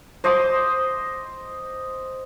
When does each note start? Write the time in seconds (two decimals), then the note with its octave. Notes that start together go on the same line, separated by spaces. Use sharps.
0.24 C5 D#5 C6 D6